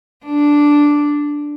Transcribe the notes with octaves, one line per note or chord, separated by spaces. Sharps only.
D4